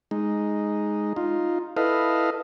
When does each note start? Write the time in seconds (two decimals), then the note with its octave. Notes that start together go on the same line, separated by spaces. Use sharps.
0.11 G#3 D#4
1.16 D#4 F4
1.77 E4 A4 B4 D#5 F5